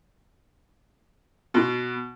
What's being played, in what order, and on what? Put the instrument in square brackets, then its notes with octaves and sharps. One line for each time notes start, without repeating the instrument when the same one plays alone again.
[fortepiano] B2